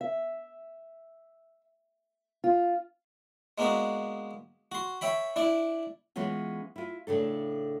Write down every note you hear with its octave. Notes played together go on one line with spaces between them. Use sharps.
E5
F4
G#3 A#3 B3 D4 F#4
F#4 C6
C#5 E5 G5 B5
D4 E4 D5
E3 G#3 B3 C#4 F4
E4 F4
A2 C#3 D4 A4